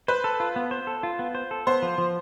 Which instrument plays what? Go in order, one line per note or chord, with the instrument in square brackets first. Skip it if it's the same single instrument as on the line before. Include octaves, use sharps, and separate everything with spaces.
[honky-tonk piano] B4 [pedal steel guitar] C5
[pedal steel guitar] A4
F4
B3
C5
A4
F4
B3
C5
A4
[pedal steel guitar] B3 [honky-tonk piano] C5
[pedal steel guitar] F3
F3